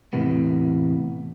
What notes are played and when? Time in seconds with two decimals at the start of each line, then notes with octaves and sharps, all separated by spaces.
0.13 E2 A2 C3 B3